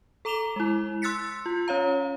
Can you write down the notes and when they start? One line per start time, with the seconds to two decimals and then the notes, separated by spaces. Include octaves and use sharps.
0.25 A4 A#5 D6 E7 F7 G7
0.56 G#3 E4
1.02 C6 E6 F#6 A6 B6 C#7
1.46 F4
1.68 C#4 C#5 F5 A#5